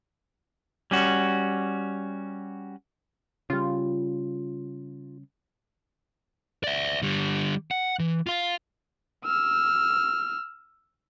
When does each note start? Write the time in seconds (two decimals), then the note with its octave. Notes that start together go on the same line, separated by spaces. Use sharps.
0.91 G3 C#4 F#4
3.50 C#3 G3 F4
6.64 D5 E5
7.02 D3 G3
7.71 F#5
7.99 E3
8.27 F4 F5
9.25 E6 F6